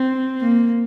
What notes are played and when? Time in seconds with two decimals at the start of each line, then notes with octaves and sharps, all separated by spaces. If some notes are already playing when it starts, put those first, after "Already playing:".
Already playing: C4
0.41 A#3